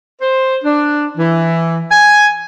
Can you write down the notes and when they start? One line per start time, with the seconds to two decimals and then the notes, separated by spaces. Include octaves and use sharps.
0.21 C5
0.64 D4
1.18 E3
1.91 G#5